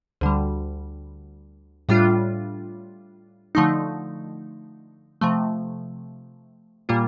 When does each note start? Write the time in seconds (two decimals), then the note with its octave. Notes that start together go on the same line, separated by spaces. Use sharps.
0.21 D2 D3 G3
1.89 A2 G3 D4 F4
3.55 D3 F3 A3 D#4
5.21 C3 F3 A3
6.89 A#2 G3 A#3 F4